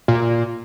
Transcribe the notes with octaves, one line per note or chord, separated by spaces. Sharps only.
A#2